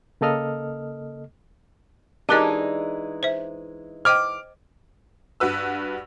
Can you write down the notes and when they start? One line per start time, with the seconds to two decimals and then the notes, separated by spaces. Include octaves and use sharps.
0.21 C#3 A#3 A4 D#5 F6
2.29 E3 G#3 D4 D#4 G4 A#4 D#5
3.23 C5 E5
4.05 C5 D#5 G5 D6 F6
5.40 G2 F#4 B4 E6